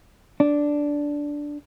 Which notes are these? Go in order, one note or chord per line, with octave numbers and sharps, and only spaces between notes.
D4